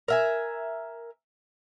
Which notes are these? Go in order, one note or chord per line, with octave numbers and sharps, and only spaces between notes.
A#4 E5 G#5